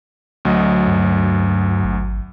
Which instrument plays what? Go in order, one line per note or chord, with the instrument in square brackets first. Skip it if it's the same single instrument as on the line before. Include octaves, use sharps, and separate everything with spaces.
[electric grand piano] D2 F#3 D#5
[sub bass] G2
G#1